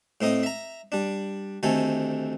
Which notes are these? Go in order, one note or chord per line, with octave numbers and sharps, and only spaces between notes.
A2 C4 D#4 D#5
E5 A#5
G3 D4
D2 C3 D#3 A4 G#5